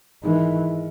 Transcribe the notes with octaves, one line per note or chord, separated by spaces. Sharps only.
G#2 D#3 E3 G#3